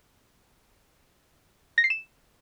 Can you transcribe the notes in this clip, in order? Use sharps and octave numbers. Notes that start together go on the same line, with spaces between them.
A#6
C7
E7